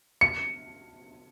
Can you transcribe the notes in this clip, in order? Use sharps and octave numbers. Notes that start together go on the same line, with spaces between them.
C#7